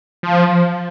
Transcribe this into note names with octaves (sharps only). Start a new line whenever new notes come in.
F3